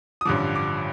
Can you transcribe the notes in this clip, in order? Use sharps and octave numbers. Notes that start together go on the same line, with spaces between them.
D#6
A1 G2 D3 F3 D6
D6